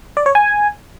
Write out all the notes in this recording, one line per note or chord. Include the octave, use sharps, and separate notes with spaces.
D5
C#5
G#5